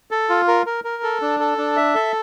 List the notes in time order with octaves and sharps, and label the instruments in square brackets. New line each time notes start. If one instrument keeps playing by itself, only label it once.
[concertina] A4
F4
A#4
A#4
A#4
A4
D4
A4
D4
E5
A4